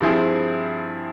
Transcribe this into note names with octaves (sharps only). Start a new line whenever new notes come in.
G2 F3 C4 E4 G#4